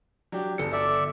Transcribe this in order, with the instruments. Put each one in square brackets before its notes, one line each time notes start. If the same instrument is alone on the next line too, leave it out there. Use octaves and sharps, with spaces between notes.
[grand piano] F#3 D4 G4
G1 A4 C#7
[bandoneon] D5 E5